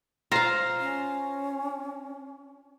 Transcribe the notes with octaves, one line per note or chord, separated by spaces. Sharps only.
F4 C5 F5 A#5
C#4